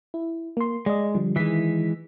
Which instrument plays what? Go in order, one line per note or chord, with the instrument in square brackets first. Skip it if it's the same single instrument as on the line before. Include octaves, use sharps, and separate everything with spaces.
[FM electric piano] E4
A#3 C6
[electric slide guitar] G#3 [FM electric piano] D5 D#5
[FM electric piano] D3 F3 G3
[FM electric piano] D#3 E4 B6 [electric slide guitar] E3 G#3